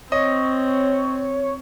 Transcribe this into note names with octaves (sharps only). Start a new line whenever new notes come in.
C4 C#5 D#5